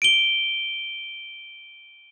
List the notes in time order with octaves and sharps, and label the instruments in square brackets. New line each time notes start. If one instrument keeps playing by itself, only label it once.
[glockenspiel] D7 D#7 G7